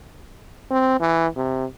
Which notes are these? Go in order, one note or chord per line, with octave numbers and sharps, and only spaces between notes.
C4
E3
C3